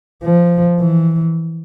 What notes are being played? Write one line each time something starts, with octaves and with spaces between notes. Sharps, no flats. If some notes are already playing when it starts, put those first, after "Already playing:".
F3
E3